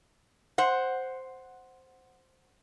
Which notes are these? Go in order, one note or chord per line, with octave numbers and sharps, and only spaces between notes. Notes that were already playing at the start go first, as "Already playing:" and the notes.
C5 F#5